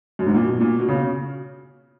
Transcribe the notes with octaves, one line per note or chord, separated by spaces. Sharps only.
F#2
G#2
A#2
B2
A#2
B2
C#3